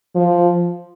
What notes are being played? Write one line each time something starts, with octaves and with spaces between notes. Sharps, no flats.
F3